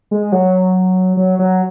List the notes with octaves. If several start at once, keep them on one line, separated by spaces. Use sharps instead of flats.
G#3
F#3
F#3
F#3